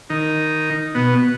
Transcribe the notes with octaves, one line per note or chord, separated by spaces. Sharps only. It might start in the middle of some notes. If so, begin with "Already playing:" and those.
D#3 D#4
B2 B3